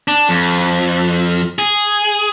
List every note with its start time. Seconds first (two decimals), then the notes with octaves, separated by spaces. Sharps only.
0.08 D4
0.29 F2
1.59 G#4